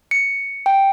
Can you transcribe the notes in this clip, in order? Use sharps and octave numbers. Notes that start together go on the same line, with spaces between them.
C#7
G5